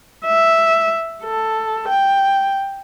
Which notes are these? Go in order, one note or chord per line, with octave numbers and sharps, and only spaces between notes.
E5
A4
G5